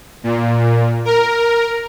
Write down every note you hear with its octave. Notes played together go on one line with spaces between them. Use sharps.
A#2
A#4